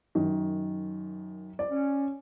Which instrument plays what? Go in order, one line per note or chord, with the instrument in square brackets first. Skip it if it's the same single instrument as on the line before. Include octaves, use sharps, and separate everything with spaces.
[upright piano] F#2 D#3
D5
[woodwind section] C#4